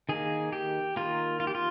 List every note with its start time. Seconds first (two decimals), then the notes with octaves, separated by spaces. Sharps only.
0.09 D#3 A#3 G#4
0.53 G4
0.96 D#3 A#3 F4
1.40 F4
1.47 G4
1.55 F4